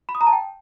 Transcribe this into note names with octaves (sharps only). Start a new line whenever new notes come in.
B5
D#6
A#5
A5
G5